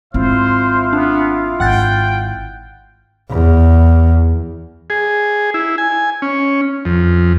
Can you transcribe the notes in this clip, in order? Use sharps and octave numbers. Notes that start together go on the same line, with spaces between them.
G#1 C4 E4 F4 C5 F5
B3 D4
G#1 F#5 G5 F#6 A6
E2
G#4
E4
G#5
C#4
F2